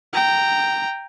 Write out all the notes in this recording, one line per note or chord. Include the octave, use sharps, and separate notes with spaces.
G5 A#5